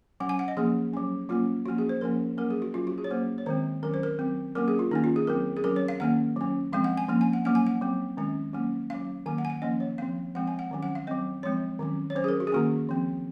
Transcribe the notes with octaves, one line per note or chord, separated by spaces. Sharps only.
F#3 C#4 F#5
G#5
F#5
D#5
F3 A#3 C#4 G#4
F#3 C#4
F#3 A#3 C#4 F4
F3 A#3 C#4 F#4
G#4
C5
F3 A#3 C#4 A#4
F#3 A#3 C#4 A#4
G#4
F#4
F#3 C#4 F4
F#4
G#4
C#5
F#3 A#3 C#4 C5
C#5
D#3 G#3 C4 C5
D#3 F#3 C#4 A#4
C5
A#4
F#3 C4
F#3 A#3 C#4 A#4
G#4
F4
D#3 A#3 C#4 D#4
F4
G#4
F#3 C4 A#4
G#4
F#3 C#4 A#4
C#5
F5
D#3 A#3 C#4 F#5
F#3 C#4
F3 G#3 C4 F5
F#5
G#5
F3 A#3 C#4
G#5
F#5
F#3 A#3 C#4 F#5
G#5
F#5
F#3 C4
D#3 G#3 C#4
F#3 A#3 C#4
F#3 C#4 F5
D#3 F#3 A#3 G#5
F#5
G#5
F#5
F3 A#3 C#4 D#5
C#5
F3 C4 F5
F3 G#3 C4 F#5
G#5
F#5
D#3 F#3 C#4
F#5
F5
F#3 C4 D#5
F3 G#3 C4 C#5
D#3 F#3 C#4
C#5
F#3 C#4 C5
G#4
A#4
F#4
G#4
D#3 A#3 C#4 F#4
F3 C4